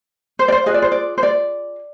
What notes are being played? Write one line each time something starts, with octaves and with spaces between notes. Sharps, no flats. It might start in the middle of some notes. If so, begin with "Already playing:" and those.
C5
D5
C5
F4 G#4 B4 D#5
D5
C5
D5
C5
D5